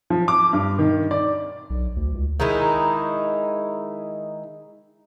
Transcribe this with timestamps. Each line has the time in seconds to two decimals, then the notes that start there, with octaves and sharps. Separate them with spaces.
0.10 F3
0.28 D6
0.53 G2
0.79 D#3
1.11 D5
1.70 B1
1.97 D2
2.14 C#2
2.40 D#3 G#3 D#4 E4